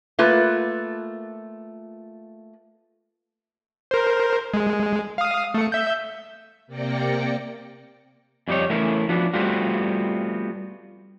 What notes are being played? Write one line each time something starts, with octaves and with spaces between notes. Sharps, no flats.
A3 A#3 F4 B4
A#4 C5
G#3
F5 D#6
A3 C#7
E5 G6
C3 A#3 D5 G5 A#6 C#7
F2 G3 G#3 D#4 C#5
E3 A3 B3 C#4 E4 A#4
F3 B3 D4 F#4
G3 A3 B3 C4 F4 F#4